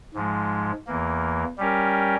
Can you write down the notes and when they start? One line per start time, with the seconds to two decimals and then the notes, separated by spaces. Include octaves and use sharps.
0.14 G#2 F3 G#3
0.87 E2 E3 A#3
1.58 G3 C#4 G4 A#4